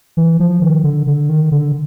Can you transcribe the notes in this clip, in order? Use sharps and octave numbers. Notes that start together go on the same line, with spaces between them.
E3
F3
D#3
D3
D3
D#3
D3